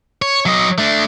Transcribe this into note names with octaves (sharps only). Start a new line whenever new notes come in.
C#5
F#3 D#5
A3 D4